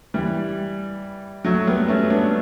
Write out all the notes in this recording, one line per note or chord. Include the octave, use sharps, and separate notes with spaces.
E3 G3
F#3 A3
G3 B3
A3 C#4
B3 D4